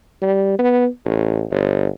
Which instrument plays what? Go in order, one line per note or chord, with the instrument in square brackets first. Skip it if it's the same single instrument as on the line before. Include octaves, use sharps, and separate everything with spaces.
[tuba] G3
B3
A1
G1